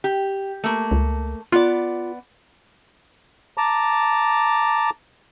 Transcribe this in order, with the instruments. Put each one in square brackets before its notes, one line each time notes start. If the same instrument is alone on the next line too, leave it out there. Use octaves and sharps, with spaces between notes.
[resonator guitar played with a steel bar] G4
A3 A#3
[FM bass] C#2
[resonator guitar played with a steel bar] B3 D5 [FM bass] F4
[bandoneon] A5 A#5 D6